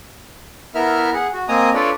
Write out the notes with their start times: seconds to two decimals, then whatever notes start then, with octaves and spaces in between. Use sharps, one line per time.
0.75 B3 E4 A#4 E5 F6
1.14 G#4 F#5
1.33 F#4
1.48 A#3 C4 D#5 G#5 A#5 D#6
1.74 D4 F4 A4 B4 C#5 D5